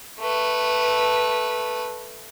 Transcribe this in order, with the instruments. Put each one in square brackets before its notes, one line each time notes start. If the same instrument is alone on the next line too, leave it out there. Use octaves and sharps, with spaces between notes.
[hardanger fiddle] A3 B4